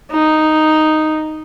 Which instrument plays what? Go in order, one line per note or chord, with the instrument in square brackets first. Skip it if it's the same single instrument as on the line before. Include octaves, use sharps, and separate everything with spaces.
[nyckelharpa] D#4